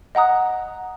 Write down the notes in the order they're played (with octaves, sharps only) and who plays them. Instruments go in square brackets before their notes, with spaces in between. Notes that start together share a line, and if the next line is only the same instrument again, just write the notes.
[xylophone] D#5 F#5 A#5 D#6 F#6